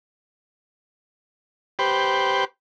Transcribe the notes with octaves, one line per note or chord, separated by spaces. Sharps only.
G4 B4 C5